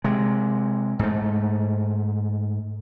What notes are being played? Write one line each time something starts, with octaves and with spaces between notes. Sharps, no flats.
C3 G#3
G#2 A3